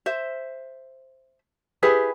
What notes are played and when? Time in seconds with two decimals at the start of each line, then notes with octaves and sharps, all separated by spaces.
0.06 C5 E5
1.82 E4 G4 G#4 B4